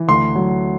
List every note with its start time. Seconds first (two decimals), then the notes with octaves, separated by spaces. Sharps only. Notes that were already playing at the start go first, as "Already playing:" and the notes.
Already playing: E3
0.08 D2 C6
0.35 F#3